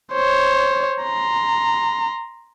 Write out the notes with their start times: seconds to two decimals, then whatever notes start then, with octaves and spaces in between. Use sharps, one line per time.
0.12 C5 C#5
1.03 A#5 C6